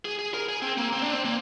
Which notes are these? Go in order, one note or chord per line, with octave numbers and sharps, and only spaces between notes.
G#4
G#4
A#4
G#4
C4
A#3
C4
D4
C4
A#3